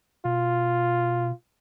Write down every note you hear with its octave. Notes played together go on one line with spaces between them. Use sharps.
B2 F4